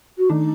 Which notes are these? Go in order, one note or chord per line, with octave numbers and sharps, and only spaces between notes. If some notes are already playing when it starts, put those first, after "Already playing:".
F#4
D#3 A3 D4 D#4